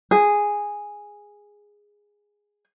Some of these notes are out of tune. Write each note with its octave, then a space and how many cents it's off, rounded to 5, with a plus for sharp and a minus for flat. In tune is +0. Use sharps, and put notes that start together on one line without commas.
G#4 -5